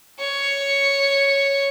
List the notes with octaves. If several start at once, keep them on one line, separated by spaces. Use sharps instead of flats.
C#5